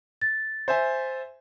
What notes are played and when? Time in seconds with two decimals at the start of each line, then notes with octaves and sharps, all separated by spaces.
0.21 A6
0.68 C5 E5 G#5